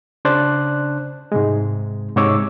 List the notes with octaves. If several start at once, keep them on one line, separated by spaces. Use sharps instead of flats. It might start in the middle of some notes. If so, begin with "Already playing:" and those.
C#3 D4 C5 D5 A5 F#6
G#2 C3 G#3
G#2 C3 C#5 D6 E6